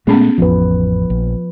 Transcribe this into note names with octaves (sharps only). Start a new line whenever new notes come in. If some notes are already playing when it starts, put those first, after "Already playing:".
A#2 G#3 A3 B3 C#4 G#4
A1 F2 F3 B4
A#1